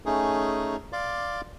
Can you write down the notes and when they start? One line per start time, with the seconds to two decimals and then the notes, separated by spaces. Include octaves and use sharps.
0.06 A3 C#4 D#4 G#4
0.93 D5 F5 C6 D6